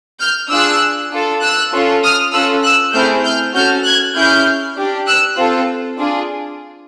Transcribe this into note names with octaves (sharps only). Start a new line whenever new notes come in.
F6 G6
D4 F4 G#4 E6 F#6
D4 F4 A4
E6 F#6
C#4 F4 A4
D#6 F6
C#4 F4 A4 E6 F#6
E6 F#6
A3 C4 E4 G#4 F6 G6
F6 G6
C#4 F#4 A4 F6 G6
F#6 G#6
C#4 E4 G#4 F6 G6
D4 G4
E6 F#6
C4 F4 A4
D4 F4 G#4